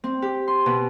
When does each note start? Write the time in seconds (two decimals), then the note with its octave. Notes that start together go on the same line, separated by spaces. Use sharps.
0.04 C4
0.22 G4
0.48 C6
0.66 B2